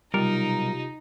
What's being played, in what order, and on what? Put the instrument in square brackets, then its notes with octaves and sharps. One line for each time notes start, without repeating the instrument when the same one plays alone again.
[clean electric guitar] B1 A#4 [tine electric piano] C3 F4 G4 [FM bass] G3 [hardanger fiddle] D#4